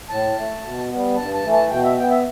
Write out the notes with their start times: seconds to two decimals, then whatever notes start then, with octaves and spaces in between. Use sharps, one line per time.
0.09 A2 A5
0.37 A3
0.63 B2
0.89 G3 B3
1.16 G2 A5
1.34 A5
1.43 E3 A3
1.53 A5
1.70 B2 G5
1.84 E5
1.97 B3 G5
2.10 E5